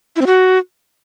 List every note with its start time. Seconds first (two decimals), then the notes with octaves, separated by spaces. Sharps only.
0.16 E4
0.21 C4
0.26 F#4